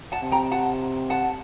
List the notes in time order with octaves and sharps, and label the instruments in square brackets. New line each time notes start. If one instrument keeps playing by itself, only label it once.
[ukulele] F#5 A5
[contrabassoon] C3
[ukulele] G5 A#5
F#5 A5
F#5 A5